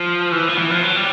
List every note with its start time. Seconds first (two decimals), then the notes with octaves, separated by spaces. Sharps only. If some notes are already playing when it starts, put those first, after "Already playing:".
Already playing: F3
0.32 E3
0.49 F3
0.58 E3
0.70 F3
0.84 F#3
0.96 G3